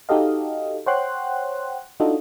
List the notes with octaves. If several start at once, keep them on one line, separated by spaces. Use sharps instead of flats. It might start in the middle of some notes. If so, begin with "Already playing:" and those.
D#4 F#4 G4 A4 D#5 F5
C5 C#5 F#5 G5 C6 F#6
D4 D#4 F4 F#4 A4 D#5